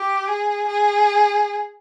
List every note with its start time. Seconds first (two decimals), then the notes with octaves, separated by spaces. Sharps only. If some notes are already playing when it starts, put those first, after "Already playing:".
Already playing: G4
0.28 G#4
0.68 G#4